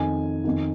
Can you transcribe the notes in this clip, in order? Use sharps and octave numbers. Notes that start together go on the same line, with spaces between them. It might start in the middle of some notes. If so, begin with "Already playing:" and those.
Already playing: F2 D#3 G#5
F2 D#3